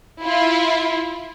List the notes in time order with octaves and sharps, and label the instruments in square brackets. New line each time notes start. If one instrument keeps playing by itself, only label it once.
[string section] E4 F4